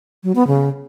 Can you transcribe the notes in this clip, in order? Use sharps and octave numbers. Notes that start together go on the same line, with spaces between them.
F#3
B3
C#3